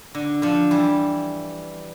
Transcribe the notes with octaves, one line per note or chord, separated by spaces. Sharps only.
D3
D3 F3
E3 G3